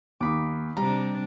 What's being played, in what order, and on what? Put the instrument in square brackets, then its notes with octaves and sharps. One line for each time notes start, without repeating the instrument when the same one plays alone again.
[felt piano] D#2 [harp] D#4 B5 D6
[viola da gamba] C3 D4 [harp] G3 [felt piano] A#5